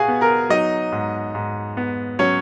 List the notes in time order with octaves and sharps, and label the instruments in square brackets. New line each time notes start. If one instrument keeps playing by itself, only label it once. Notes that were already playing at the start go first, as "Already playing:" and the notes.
Already playing: [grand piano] B2 F#4 G#4 F5 G#5
B3
A#4 A#5
F#3 D#4 D#5
G#2
G#2
B3
F#3 C#4 C#5